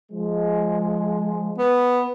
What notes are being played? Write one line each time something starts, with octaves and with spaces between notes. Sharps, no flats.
F3 G#3
B3